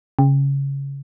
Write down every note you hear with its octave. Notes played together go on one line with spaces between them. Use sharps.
C#3